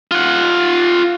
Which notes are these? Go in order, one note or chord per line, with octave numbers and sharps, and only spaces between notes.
F4 F#5